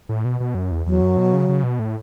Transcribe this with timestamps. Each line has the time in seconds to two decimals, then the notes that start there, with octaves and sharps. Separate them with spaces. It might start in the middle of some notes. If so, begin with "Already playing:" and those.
0.09 A2
0.25 B2
0.40 B2
0.55 F#2
0.71 E2
0.86 E2 F#3
1.01 F#2
1.17 B2
1.33 C#3
1.49 C#3
1.63 B2
1.79 A2